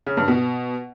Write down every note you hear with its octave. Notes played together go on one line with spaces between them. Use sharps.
C#3
G2
B2